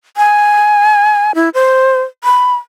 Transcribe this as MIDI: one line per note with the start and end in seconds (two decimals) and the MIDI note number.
0.17 1.32 80
1.35 1.49 64
1.54 2.02 72
2.24 2.55 83